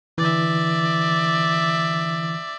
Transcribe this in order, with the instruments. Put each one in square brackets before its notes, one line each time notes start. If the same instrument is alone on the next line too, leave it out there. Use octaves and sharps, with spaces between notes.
[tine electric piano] D3 E3 [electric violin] D5 E5